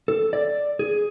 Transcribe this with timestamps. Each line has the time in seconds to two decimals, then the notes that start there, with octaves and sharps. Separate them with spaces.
0.08 A4
0.33 D5
0.79 G#4